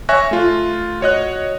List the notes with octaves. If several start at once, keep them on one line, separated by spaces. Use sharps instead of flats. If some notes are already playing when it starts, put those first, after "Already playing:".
C#5 E5 G#5 C#6 F#6 A#6
A3 F4
F#4 C#5 D#5 F#6